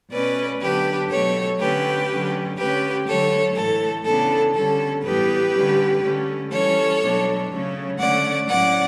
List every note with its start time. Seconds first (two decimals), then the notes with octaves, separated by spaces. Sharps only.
0.11 B2 A3 C#4 B4 D5
0.61 D3 F#3 B3 D4 G4 B4
1.11 B2 F#3 A3 A4 C#5
1.59 D3 A3 C#4 G4 B4
2.09 D3 F#3 C#4
2.58 D3 A3 C#4 G4 B4
3.07 D3 F#3 A3 A4 C#5
3.56 A2 E3 A3 A4
4.05 C#3 E3 B3 D4 A4
4.55 D3 G3 C#4 A4
5.04 A2 E3 G3 B3 G4 B4
5.53 D3 G3 C#4
6.02 D3 A3 C#4
6.52 E3 G3 C#4 A4 C#5
7.01 B2 F#3 A3 D4
7.51 C#3 F#3 A3 C#4
7.99 D3 A3 C#4 D5 F#5
8.48 A2 F#3 C#4 D5 F#5